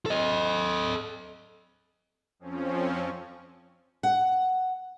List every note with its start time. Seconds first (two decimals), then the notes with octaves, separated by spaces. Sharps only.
0.06 A4 D#5
2.39 F2 F3 C4 C#4
4.03 F#5